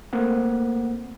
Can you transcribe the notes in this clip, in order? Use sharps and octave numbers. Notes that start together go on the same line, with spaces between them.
A3 A#3 C4 F#5